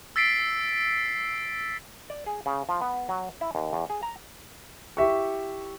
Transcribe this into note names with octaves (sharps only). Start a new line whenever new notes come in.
E6 A6 B6 C7 D7
D5
G#4
C#3
F3
B3
F#3
E4
D#2
E2
G#4
A#5
E4 G4 E5 C#6